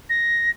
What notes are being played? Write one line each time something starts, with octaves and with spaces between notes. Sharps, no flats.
A#6